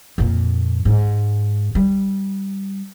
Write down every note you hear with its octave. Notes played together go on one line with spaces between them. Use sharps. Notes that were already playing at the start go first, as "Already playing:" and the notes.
F2 A#2
G#2
G3